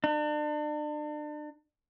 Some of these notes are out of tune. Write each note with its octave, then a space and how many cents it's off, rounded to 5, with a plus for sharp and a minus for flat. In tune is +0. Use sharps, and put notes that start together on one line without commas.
D4 +35